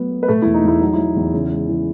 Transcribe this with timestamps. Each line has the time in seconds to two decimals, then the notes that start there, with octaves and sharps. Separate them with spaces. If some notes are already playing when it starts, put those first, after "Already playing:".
Already playing: F#3 A3 B3 B4
0.11 A3
0.23 B4
0.28 B2 A3 A4
0.42 E2 E4
0.54 D#4
0.64 E2 E4
0.80 F#3 D#4
0.93 F#3 E4
1.16 E2
1.34 C#3
1.51 G#3
1.69 E3